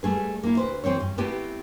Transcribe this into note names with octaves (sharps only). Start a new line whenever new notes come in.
G3 A3 G#4 B4
A#3 E4
D2 B4 C5
E3 C4 C5 C#5
G2
A3 B3 C4 E4 G4 B4